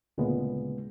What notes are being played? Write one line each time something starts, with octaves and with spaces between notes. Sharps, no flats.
D2 A#2 C#3 G#3 B3